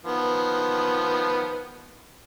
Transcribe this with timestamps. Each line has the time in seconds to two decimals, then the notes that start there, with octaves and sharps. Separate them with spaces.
0.05 D#3 F3 B3